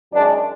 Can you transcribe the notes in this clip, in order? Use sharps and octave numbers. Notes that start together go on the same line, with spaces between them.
F#2 D#3 G#3 D4